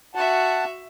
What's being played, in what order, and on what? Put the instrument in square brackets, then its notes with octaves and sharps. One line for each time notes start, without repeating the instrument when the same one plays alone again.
[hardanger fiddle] F#4 E5 [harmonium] F#5 A5